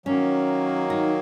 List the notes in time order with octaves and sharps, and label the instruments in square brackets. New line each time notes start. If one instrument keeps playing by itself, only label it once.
[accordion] D#3 F#3 A#3 [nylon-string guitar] C#4
[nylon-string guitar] D#4